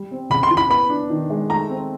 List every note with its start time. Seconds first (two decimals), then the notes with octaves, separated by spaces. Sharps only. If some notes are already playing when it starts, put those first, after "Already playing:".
Already playing: G3
0.11 C4
0.30 C#3 B5
0.43 C6
0.50 E3
0.57 B5
0.70 B3 B5
0.90 D4
1.10 D#3
1.30 G#3
1.49 A3 A#5
1.70 C4